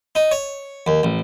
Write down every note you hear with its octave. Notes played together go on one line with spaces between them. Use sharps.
D#4
C#5
D#2
A1